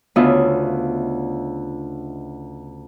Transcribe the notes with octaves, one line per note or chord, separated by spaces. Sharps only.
D2 C#3 B3 F4 D#5 E5